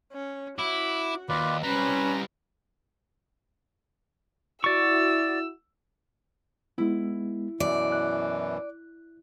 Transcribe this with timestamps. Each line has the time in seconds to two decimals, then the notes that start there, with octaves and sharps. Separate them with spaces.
0.13 C#4
0.58 E4 F#4 D6
1.29 D#2 F4 B4 D5
1.63 G3 C#4 B4 C5 A#5
4.64 E4 F#4 D5 C#6 E6
6.78 G#3 B3 E4
7.60 F#2 B2 E3 D5
7.92 F#6